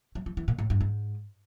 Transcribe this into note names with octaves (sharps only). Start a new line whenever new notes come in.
F#3
F3
E3
A#2
A2
G2
G#2